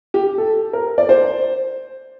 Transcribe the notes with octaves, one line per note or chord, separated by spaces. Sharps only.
G4
A4
A#4
D5
C5